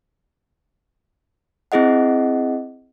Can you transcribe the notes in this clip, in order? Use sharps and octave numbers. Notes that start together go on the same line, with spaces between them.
C4 E4 G#4 D#5 F#5